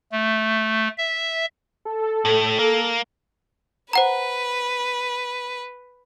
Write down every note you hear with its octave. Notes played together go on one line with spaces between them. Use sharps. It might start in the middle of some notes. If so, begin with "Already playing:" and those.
A3
E5
A4
A2
A#3
B4 C5 F#5 A#5